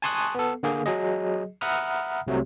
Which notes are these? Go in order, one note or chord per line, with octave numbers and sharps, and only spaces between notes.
G#5 A5 C6 C#6 D#6 F#6
B3 A4
D3 A#3 G#4
F#3 G#4 D#5
E5 F#5 A#5 B5 D#6 F6
C2 C3 F#3 A3